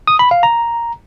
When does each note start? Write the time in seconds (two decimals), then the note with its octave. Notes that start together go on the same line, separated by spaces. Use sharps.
0.07 D#6
0.19 B5
0.31 F5
0.43 A#5